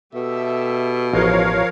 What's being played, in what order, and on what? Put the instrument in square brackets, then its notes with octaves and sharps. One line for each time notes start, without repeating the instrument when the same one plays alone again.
[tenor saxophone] B2 [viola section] G4 A4 E5
[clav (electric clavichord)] A1 [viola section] F3 [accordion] A#4 C#5 F5